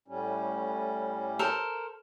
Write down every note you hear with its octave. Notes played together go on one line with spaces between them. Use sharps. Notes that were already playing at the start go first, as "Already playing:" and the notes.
A2 G3 C#4
A4 A#4 C5